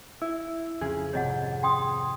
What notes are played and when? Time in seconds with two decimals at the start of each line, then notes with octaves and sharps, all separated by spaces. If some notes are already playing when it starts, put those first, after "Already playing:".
0.22 E4
0.81 F2 C#3 G#4
1.13 G#1 F2 C3 C#5 D#5 F#5
1.63 G5 C6 D#6